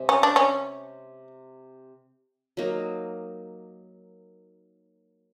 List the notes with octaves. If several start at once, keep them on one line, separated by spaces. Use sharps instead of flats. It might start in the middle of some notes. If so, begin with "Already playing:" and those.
Already playing: C3 G#3
C#4
D4
C#4
F#3 A#3 D#4